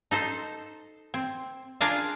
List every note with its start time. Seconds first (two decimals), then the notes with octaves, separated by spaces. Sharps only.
0.11 D#4 A4 C5
1.14 C4
1.81 D4 F4 G#4 A#4 F5